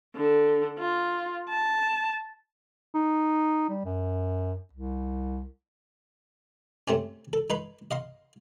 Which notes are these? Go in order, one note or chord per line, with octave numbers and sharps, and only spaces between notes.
D3
F4
A5
D#4
G3
F#2
C2
C3 A3 C4 C#4
A4
D#4 B4 C6
D#5 F5 C6